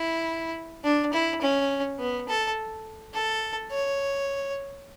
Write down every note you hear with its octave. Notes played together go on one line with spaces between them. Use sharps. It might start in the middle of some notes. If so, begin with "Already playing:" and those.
Already playing: E4
D4
E4
C#4
B3
A4
A4
C#5